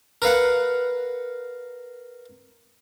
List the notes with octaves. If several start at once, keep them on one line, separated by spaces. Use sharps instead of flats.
A#4 B4 F5 F#5